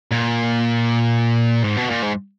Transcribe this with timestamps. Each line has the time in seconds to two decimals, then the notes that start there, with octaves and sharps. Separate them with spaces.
0.12 A#2
1.64 G#2
1.77 B2
1.90 A#2
2.02 G#2